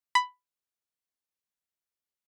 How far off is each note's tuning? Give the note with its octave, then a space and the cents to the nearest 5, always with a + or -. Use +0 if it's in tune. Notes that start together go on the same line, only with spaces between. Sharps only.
B5 +10